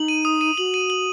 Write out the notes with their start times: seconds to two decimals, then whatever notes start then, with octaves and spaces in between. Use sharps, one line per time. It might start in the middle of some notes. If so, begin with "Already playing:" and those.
Already playing: D#4 F#7
0.08 D#7
0.25 D#6
0.41 D#7
0.57 F#4 F#7
0.74 D#7
0.90 F#7